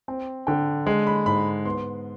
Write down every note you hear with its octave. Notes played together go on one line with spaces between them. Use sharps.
C4 G5
D3 G5
G#3
B5
G#2 B5
B3 C6